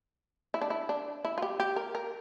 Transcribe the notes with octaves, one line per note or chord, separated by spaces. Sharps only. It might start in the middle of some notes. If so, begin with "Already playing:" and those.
E4
D4
E4
D4
E4
F4
G4
G4
A#4
A#4